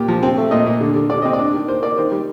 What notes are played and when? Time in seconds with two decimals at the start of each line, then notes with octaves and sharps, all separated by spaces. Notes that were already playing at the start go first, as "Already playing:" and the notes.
Already playing: A#2 G4
0.08 F3
0.23 C4
0.37 A3
0.51 A#2 D#5
0.66 A#2
0.81 D3
0.96 D3
1.10 D3 D5
1.22 C4 D#5
1.33 D5
1.39 D4
1.54 D#3
1.68 A#3 C5
1.83 A#3 D5
1.98 D#3 C5
2.12 G3